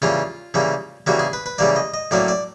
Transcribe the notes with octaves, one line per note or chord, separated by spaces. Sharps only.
C#3 E3 G3 A#3 F4
C#3 E3 G3 A#3
C#3 E3 G3 A#3 F#4
G#4
B4
B4
C#3 E3 G3 A#3 D5
D#5
D#5
A2 F#3 A#3 C#4 D5
D5